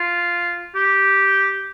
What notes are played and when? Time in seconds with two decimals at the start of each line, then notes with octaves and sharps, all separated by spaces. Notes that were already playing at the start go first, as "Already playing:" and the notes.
Already playing: F4
0.75 G4